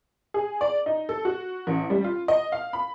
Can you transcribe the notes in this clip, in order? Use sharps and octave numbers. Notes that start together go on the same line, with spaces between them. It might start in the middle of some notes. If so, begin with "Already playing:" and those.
G#4
D5
D#4
A4
F#4
A1
G3
F4
D#5
F5
B5